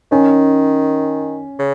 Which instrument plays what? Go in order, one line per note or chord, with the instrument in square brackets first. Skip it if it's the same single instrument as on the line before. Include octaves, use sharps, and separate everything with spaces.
[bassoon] D#3 [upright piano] C#4
[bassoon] C#3